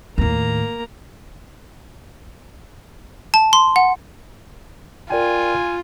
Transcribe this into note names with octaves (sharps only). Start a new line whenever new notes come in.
D#2 A2 A#3 A#5
A5
C6
F#5
F4 A#4 D5 G5 G#5